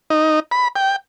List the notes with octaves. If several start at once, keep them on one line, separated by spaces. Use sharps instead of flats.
D#4
B5
G5